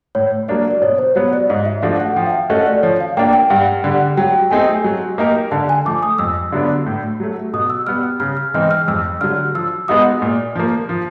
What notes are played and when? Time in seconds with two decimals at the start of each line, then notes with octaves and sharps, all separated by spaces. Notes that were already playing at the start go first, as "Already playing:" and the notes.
0.15 A2 C#5
0.48 F#3 A#3 D4 D5
0.71 D5
0.82 B2 C#5
0.98 C5
1.15 F#3 B3 C#5
1.33 D5
1.50 G#2 D#5
1.65 E5
1.82 F3 A3 D4 F#4 F5
2.00 F#5
2.16 F3 G5
2.26 F5
2.33 E5
2.50 A3 C#4 F#4 A4 D#5
2.67 D5
2.83 F3 C#5
3.01 F5
3.17 A#3 D4 G5
3.33 G5
3.50 G2 F#5
3.84 D3 G3 F#5
4.17 F#3 G5
4.51 A3 C4 D#4 G#4 G#5
4.84 F#3
5.18 A#3 D#4 G4 A#4
5.51 D3 A5
5.69 G#5
5.85 F3 A3 D6
6.03 D#6
6.18 F2 E6
6.52 D3 F#3 B3 D4
6.86 A2
7.20 F#3 A3
7.53 B2 D#6
7.70 E6
7.87 G3 B3 F6
8.20 C#3 F6
8.37 F6
8.54 E3 G#3 C4 D#4 F6
8.71 F6
8.88 F2 E6
9.21 D3 F#3 F6
9.55 F3 E6
9.88 G#3 B3 D#4 F#4 D#6
10.22 A#2
10.56 F3 A#3
10.89 F3